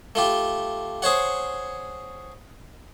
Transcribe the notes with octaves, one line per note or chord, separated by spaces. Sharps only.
A3 F4 G4
G#4 C5 C#5 F#5